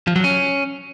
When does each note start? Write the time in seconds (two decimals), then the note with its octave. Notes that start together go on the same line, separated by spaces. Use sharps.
0.07 F3
0.16 F#3
0.24 C#4